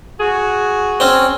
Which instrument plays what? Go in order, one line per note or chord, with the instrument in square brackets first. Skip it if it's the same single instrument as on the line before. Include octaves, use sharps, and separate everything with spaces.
[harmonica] F#4 [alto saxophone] G#4
[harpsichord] C4 C#4